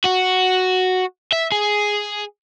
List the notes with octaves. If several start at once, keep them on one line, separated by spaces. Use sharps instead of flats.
F#4
E5
G#4